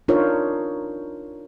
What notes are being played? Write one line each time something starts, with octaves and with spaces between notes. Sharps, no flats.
D4 D#4 F4 A#4 C5 C#5